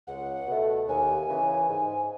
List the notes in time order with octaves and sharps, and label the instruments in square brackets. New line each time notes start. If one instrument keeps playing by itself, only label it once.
[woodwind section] C#2 [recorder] F#5
[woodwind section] B2 A3
[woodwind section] D#2 [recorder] G#5
[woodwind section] C#3 E3
G#2